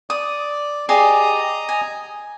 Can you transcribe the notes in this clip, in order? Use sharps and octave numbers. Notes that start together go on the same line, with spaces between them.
D5 D#6
G4 G#4 D5 D#5 A#5 D#6
G#5